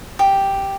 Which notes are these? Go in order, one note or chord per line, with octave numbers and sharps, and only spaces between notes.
G4